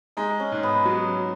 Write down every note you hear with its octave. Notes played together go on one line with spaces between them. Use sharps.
G#3 D#4
C#4
G#2
B3
F#3